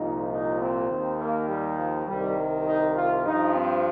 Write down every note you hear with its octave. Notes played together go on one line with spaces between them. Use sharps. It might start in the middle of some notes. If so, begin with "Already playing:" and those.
Already playing: C2 A#2 F3 D#4
D#4
C4
D#2 D#3
A#3
G3
F3
C2 C3 D#3 G3
D#4
F4
G2 F3 D#4
C4